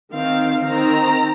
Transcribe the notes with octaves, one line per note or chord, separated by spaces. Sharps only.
D#3 C4 F5
D#3 C4 A#5